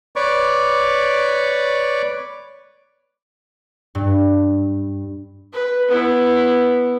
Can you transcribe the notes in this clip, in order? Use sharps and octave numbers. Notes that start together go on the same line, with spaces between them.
B4 C#5 D5 C#6 D6
G2
B4
B3 E4